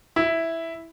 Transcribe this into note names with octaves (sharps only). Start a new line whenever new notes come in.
E4